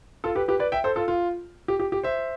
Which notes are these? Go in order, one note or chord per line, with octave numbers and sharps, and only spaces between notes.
F4 A4
G4 B4
G4 B4
B4 D5
E5 G5
A4 C5
F4 A4
F4
G4
G4
G4
C5 E5